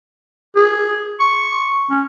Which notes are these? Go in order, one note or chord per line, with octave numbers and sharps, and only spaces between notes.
G#4
C#6
C#4